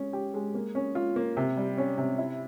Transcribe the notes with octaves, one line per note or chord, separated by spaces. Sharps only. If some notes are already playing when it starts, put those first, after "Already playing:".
Already playing: G#3 C#4
G4
G#3
A#3
C#4
F4
A#3
C3
G3
C#4
C3
E4